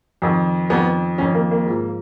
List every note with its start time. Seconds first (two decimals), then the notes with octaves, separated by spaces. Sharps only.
0.22 F2 D#3
0.70 F2 D#3 B3
1.18 F2 D#3 C#4
1.34 A#3
1.51 A#3
1.66 G#2 F3